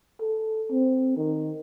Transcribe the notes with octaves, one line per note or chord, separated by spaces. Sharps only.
A4
C4
D#3